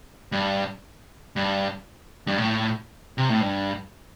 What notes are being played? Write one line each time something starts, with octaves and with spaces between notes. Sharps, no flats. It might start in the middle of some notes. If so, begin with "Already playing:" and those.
G2
G2
G2
A2
C3
A2
G2